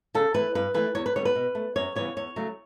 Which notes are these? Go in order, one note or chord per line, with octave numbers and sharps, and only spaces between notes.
C#3 A4
E3 A3 B4
G2 B4
E3 A3 B4
E2 C#5
B4
D3 G3 B3 C#5
B4
B2
A3
F#2 C#5
C#3 E3 G3 B3 C#5
E2 C#5
C#3 F#3 A3